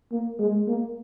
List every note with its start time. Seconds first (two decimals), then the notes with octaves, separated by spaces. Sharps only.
0.12 A#3
0.39 G#3
0.67 A#3